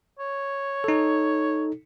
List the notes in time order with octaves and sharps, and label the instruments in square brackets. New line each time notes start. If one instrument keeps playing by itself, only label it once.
[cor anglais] C#5
[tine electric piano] D#4 A4